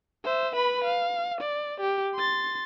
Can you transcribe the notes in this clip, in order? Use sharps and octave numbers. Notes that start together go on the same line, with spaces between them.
C5 E5
B4 B5
F5
D5
G4
C6 A6